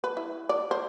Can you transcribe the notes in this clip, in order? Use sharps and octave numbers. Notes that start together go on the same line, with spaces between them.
B4
E4
D5
C5